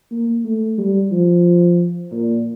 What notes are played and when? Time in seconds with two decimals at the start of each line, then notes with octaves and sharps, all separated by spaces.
0.11 A#3
0.45 A3
0.78 G3
1.12 F3
2.12 A#2